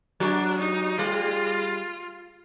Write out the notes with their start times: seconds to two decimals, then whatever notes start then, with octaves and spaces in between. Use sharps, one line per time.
0.20 F#3 D4 F#4
0.60 D#4
0.98 G3 F4 G4